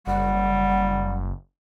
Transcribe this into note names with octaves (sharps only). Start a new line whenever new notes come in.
F#1 G3 F#5